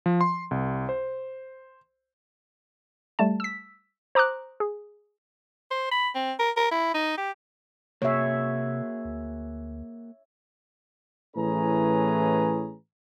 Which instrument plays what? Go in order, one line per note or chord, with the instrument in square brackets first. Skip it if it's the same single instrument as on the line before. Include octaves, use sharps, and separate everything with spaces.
[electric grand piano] F3
C6
C2
C5
[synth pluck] G3 A3 A5
E6 B6
C5 A#5 D6 D#6 F#6
G#4
[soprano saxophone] C5
B5
C4
A#4
A#4
E4
D#4
G4
[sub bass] C3 [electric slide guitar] A#3 F#4 G#4 [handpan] C#5 E5
[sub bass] D2
[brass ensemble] A2 E3 C#4 G#4 B4 A#5